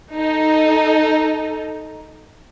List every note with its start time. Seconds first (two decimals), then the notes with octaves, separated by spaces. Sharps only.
0.14 D#4 A4